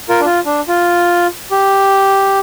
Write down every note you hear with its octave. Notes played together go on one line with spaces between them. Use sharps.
F4 A#4
D4
F4
D4
F4
G4